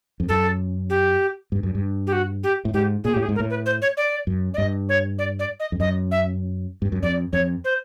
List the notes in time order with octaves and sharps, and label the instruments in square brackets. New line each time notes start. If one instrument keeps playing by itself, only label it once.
[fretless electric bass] F2
[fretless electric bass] F#2 [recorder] A4
[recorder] G4
[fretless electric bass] G2
F#2
G2
[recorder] G4
F#4
G4
[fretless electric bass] A2
[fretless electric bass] G#2 [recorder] G4
[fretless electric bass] A#2 [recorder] G#4
[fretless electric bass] A2 [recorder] G4
[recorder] G#4
[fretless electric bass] G#2
[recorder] A#4
[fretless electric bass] A2
[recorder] B4
C5
C#5
D5
[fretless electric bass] F#2
[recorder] D5
[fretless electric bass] G2 [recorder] D#5
[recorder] C#5
D5
D5
D#5
[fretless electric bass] F2
[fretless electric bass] F#2 [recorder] D#5
[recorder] E5
[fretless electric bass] G2
F#2
[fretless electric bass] F2 [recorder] D5
[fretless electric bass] F2 [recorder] C#5
[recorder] C5